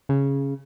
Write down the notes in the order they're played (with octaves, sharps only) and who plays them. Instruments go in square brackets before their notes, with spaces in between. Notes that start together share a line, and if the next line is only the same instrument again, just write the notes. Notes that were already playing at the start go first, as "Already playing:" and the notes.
[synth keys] C#3